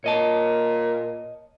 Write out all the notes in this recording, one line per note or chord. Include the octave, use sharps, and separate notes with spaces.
A#2 C#5 D#5 A5